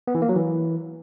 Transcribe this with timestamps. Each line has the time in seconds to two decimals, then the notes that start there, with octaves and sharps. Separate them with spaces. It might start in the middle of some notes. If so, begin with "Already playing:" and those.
0.07 B3
0.15 E3
0.22 A#3
0.29 F#3
0.36 E3